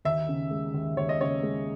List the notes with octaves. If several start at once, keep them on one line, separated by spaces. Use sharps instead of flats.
D#2 E5
C#3
G#3
D#2
D#2 C#5
D#5
C#3 C#5
G#3